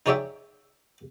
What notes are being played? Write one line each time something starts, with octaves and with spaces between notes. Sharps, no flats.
D#4 G#4 C#5 D5 E5 G5